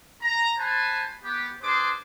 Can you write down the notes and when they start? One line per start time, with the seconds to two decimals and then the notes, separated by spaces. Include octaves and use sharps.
0.22 A#5
0.58 B4 C5 G#5 A5
1.23 B3 G4
1.62 D4 G#4 B4 C5 D6